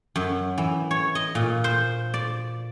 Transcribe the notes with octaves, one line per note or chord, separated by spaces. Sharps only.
F#2
E3
C#5
D#5
A#2
C5
D5